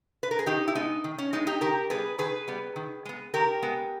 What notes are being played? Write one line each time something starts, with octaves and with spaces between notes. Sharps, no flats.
B4
A#4
G#4
D#3 D#4 G4
E4
G#3 B3 D#4
D#3
C#4
G#3 B3 D#4
D#4 G4
D#3 G4 A#4
G3 B3 G#4 B4
D#3 G#4 B4
G3 B3
D#3
G#3 B3
D#3 G4 A#4
G#3 B3